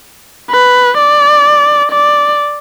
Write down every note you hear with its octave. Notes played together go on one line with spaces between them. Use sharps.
B4
D5
D5